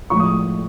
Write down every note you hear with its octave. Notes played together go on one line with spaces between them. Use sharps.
A2 F3 G#3 C#6
D#6